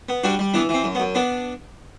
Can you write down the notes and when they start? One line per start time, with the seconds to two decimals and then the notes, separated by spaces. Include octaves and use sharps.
0.09 B3
0.24 G3 D4 F#4
0.39 G3
0.54 E3 B3 D4
0.69 E3 C4
0.84 F#2
0.95 B3
1.00 F#2
1.15 B3 D4